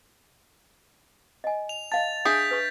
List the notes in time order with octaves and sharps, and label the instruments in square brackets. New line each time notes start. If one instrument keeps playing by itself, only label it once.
[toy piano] D#5 G#5
[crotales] F7
[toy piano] D#5 F5 A5 [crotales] A6
[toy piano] D4 E5 [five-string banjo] G#4 [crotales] G6 B6 D7
[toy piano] B4 C#6